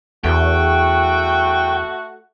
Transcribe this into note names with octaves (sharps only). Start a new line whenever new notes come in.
E2 A3 F#4 G5